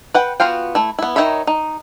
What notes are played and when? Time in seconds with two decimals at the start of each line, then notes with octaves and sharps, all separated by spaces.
0.14 B4 F#5 G5
0.40 B3 F4 F#4 F5 G5
0.75 A3 E4
0.99 B3 E4
1.16 D#3 D#4 C#5 E5 B5
1.47 D#4